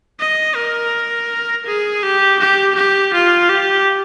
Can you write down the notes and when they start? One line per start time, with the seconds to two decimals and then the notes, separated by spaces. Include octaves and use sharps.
0.20 D#5
0.56 A#4
1.67 G#4
2.03 G4
2.40 G4
2.76 G4
3.14 F4
3.49 G4